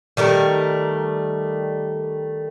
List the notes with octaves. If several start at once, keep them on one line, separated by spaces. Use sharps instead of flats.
D#3 G3 A3 A#4